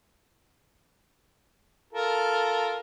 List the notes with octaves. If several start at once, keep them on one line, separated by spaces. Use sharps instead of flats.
F4 A4 A#4